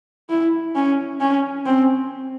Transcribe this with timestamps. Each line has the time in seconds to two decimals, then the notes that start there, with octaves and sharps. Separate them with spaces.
0.30 E4
0.75 C#4
1.20 C#4
1.66 C4